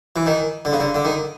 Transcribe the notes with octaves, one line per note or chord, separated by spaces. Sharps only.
E3
D#3
D3
C#3
D3
D3
D#3